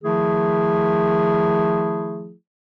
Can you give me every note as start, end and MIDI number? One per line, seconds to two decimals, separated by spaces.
0.04 2.32 51
0.04 2.32 53
0.04 2.32 57
0.04 2.32 64
0.04 2.32 68